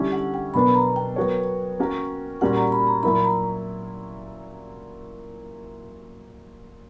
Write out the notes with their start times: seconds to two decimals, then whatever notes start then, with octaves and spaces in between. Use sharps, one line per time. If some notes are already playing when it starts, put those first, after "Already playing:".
Already playing: D3 G3 C#4 E4 G4
0.12 F#5
0.34 G5
0.54 B2 F#3 B3 D4 A#4 B5
0.75 A#5
0.96 G5
1.16 F#3 B3 F#4 A#4 C#5
1.79 A#3 C#4 F#4 A#4
2.41 A#2 G3 C#4 F#4 A#4 F#5
2.56 A#5
2.72 B5
2.87 A#5
3.03 A#2 F#3 A#3 E4 B5
3.24 A#5